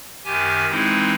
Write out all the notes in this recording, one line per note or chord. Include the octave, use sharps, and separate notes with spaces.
F#2 D#3 G4 G#5
E3 G#3 C4 D#4 E4